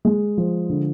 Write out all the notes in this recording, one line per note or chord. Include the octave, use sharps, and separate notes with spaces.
G#3
F3
D3